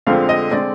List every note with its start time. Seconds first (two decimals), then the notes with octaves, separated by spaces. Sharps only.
0.07 F2 D3 G#3 C4 F5
0.29 D#5
0.51 D3 G#3 C4 D5